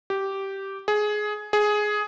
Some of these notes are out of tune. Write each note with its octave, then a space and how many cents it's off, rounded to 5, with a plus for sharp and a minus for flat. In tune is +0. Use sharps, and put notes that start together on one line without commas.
G4 -10
G#4 +15
G#4 +10